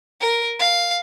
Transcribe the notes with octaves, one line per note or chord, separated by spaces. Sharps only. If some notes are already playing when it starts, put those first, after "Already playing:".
A#4
F5